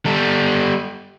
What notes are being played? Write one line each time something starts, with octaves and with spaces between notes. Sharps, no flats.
G3 A4